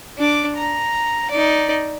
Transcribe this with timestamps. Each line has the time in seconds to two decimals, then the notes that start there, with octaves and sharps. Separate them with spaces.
0.18 D4 D6
0.57 A#5
1.31 D#4 D5